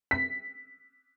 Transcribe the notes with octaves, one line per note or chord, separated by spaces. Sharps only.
B6